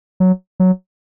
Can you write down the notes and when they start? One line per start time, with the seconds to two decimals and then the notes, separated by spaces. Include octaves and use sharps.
0.20 F#3
0.60 F#3